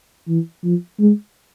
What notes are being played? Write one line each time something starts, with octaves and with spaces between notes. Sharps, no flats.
E3
F3
G#3